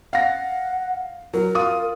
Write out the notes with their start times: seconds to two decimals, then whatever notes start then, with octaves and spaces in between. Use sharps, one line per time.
0.13 F5 F#5 A#6
1.34 F#3 A#4
1.55 F4 D#6